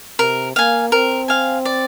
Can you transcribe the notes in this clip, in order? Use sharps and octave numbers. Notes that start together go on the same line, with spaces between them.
C3 A#4
A#3 F5 G#5
C4 A#4
F5 G#5
D5